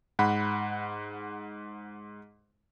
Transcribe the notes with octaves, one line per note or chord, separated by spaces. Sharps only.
G#2 F#5 B5